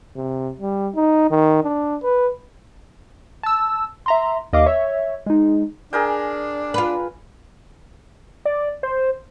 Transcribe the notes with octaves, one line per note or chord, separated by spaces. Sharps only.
C3
G3
D#4
D#3
D4
B4
A5 E6
E5 A#5 C6
D#2 D#5 F5 D6
C#5 E5
G#3 D#4
D4 G#4 A#4 G5
F4 B4
D5
C5